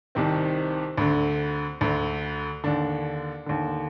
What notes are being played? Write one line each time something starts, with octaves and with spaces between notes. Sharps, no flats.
C2 C3 D#3 C4
D2 D3
D2 D3
D#2 D3 D4
D#2 D3